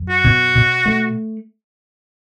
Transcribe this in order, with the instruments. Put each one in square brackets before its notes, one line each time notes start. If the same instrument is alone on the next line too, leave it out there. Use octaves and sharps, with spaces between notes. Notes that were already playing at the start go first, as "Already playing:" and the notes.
Already playing: [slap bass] F#2
[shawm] F#4
[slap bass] B2
B2
A3